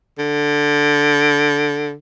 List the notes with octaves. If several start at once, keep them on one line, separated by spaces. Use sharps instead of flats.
D3